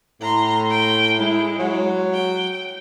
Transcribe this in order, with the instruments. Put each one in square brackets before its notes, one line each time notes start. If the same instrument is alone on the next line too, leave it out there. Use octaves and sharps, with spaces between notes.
[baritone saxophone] A2 [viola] A#5 C6
[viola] G5
[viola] G#3 [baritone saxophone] E4
[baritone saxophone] F#3
[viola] G5